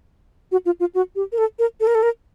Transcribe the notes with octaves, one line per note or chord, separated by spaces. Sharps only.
F#4
F4
F4
F#4
G4
A#4
A4
A#4
A4
A#4
A4
A#4